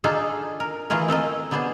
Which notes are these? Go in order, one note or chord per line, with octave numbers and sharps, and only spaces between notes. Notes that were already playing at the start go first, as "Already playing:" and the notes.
D4 D#4 F4 G#4 A4
A#4
E3 A3 F4 G#4 A#4
C4 A4 A#4 D#5
D3 B3 D4 G#4 C5